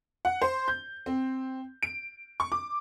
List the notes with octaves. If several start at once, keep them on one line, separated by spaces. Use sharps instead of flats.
F#5
C5
G6
C4
D7
C#6
D6